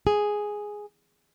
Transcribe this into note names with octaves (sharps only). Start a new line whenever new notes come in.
G#4